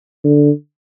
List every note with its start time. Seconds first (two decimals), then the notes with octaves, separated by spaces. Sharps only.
0.24 D3